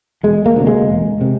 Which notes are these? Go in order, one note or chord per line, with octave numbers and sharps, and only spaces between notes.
E1 G#3
A#3
D2 C3
G#3
E1
C3